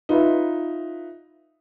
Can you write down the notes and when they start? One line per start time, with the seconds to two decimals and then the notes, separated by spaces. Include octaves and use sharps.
0.09 D#4 F4 B4 E5